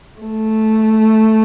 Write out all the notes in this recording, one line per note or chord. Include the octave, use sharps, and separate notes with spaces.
A3